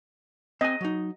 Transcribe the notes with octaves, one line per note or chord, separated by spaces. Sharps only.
C4 D#5 G#5
F#3 D#4